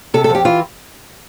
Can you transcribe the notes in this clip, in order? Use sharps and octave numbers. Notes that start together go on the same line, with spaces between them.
C3 A4
A4
F2 G4
E3 F4